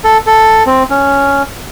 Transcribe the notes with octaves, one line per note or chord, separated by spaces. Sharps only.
A4
A4
C4
C#4